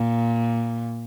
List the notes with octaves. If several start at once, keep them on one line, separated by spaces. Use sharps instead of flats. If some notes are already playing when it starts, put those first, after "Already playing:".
Already playing: A#2